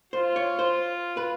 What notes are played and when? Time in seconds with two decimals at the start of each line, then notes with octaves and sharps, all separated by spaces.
0.12 F4 C5
0.36 C#5
0.59 C5
1.17 B4